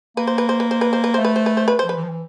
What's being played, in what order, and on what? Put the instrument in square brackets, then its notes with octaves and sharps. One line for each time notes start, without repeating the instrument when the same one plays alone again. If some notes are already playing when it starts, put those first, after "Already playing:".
[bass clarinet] A#3 [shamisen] B4
[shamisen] C5
B4
C5
B4
C5
B4
C5
B4
[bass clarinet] A3 [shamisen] C5
[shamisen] B4
C5
B4
C5
B4
[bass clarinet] F3 [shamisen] C5
[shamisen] B4
[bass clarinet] E3
F3
E3